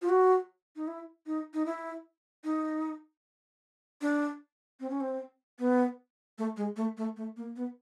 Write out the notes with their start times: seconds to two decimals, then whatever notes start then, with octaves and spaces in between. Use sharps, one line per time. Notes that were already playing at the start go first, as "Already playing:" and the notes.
0.02 F4
0.09 F#4
0.76 D#4
0.87 E4
1.26 D#4
1.54 D#4
1.66 E4
2.44 D#4
4.02 D4
4.80 C4
4.90 C#4
5.01 C4
5.59 B3
6.38 A3
6.57 G#3
6.76 A3
6.97 A3
7.17 A3
7.37 A#3
7.56 B3